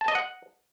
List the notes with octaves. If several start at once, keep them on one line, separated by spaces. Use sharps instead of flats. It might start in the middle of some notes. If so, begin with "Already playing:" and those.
A5
D#5
F#5